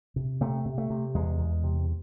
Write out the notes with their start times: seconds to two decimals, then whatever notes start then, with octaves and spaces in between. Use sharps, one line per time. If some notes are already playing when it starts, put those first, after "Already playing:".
0.16 C3
0.41 C3 A3
0.65 C3
0.78 A3
0.90 C3
1.14 E2 G#3
1.39 E2
1.64 C3